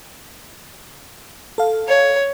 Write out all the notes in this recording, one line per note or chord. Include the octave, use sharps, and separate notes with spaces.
A4 F5
C#5